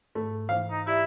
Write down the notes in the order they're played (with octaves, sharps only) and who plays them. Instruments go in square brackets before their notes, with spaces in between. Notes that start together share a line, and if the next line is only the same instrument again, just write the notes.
[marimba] G#2 [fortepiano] A3
[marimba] E3 C5 [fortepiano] F5
[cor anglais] D#4
[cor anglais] E4 [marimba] G4 D5 E5